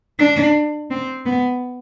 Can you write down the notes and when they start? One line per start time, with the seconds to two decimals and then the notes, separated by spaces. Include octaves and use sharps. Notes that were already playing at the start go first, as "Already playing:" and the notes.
0.19 D4
0.90 C4
1.26 B3